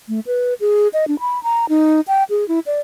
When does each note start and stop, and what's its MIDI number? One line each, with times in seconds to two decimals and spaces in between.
0.09 0.20 57
0.26 0.54 71
0.60 0.88 68
0.93 1.08 75
1.08 1.19 62
1.20 1.42 83
1.43 1.66 82
1.69 2.01 63
2.08 2.23 79
2.30 2.47 68
2.48 2.60 64
2.66 2.80 74